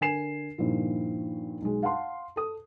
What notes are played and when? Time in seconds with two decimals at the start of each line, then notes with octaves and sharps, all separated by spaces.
0.01 D3 A#4 G#5 C7 E7
0.58 G2 A#2 D#3 F3 E4
1.62 B1 G#3
1.83 F5 F#5 A5 C6
2.36 A4 D#6